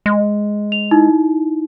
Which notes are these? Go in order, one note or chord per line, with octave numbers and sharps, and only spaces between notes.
G#3
F7
D#4 E4